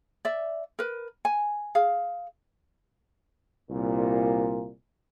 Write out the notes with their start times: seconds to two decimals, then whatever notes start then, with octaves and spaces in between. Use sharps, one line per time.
0.25 D5 E5
0.79 A#4 B4
1.25 G#5
1.75 G#4 F5
3.70 C2 A#2